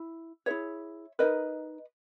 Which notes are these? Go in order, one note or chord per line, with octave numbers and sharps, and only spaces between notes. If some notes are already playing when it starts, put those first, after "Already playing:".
Already playing: E4
E4 G#4 B4 C#5 E5
D#4 A#4 B4 D#5